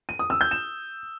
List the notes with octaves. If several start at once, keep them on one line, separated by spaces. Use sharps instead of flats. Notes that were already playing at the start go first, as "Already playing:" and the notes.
D#7
D#6
E6
G6
E7